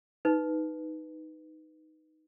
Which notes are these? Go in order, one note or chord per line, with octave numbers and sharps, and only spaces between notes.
D#4 B4